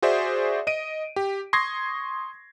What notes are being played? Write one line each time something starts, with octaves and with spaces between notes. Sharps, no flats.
F#4 G#4 C5 D5 E5
D#5 D7 D#7
G4
C6 C#6 D#6 G#6 A#6 C7